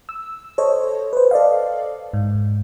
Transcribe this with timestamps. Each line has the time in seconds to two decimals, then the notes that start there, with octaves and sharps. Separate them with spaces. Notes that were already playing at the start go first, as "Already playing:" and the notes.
0.09 E6
0.58 A4 C5 C#5 D#5
1.13 B4 C5
1.31 A4 D5 D#5 F5
2.14 G#2